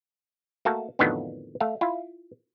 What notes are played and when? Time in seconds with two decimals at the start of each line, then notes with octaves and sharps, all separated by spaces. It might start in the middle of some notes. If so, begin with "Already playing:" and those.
0.65 A3 A#3 F#4 A5
0.99 F2 A2 D3 D#3 F#3 B3
1.60 A3 F5
1.81 E4 F4